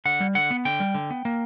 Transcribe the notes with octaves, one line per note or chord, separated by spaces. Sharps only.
D3 F#5
G3
D3 F#5
B3
D3 G5
G3
D3
B3
A#3